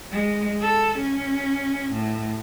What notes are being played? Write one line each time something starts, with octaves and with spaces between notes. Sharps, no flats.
G#3
A4
C#4
A2